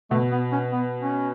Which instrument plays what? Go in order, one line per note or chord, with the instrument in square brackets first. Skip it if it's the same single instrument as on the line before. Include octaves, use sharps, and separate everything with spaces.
[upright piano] B2 [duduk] A3
[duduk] B3
C#4
B3
C#4